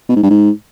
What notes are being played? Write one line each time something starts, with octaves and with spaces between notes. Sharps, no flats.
B2
G#2
G2
G#2